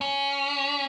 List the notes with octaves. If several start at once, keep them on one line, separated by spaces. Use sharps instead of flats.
C#4